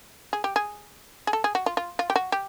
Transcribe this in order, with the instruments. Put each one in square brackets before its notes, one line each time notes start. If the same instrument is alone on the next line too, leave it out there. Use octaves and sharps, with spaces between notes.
[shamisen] G#4
G4
G#4
G#4
A4
G#4
F#4
F4
F4
F4
G4
F#4
G4